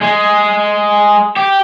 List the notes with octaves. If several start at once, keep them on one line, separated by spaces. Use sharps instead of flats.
G#3
G4